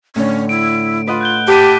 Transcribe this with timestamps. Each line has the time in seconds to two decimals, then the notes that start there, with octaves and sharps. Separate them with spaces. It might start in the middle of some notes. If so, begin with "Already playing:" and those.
0.16 A2 D3 C#4
0.49 E4 D7
1.07 F4 B4 D#5 F#5
1.21 F#6 G6 G7
1.48 G4 B4 A5 D6 B6 D#7